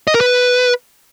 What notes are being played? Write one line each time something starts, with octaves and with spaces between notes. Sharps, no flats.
D#5
A#4
B4